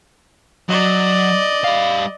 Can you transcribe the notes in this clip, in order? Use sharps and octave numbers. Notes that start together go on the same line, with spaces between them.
F#3 D5 D#5
G3 F5